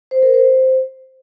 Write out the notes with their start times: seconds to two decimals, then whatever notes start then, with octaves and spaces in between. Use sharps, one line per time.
0.11 C5
0.23 A#4
0.34 C5